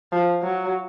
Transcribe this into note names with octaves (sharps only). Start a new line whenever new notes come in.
F3
F#3